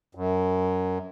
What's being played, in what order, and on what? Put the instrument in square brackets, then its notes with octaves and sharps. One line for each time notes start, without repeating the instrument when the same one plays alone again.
[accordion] F#2